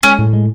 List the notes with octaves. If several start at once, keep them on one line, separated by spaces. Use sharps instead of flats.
G#3 C#4
A2
G#3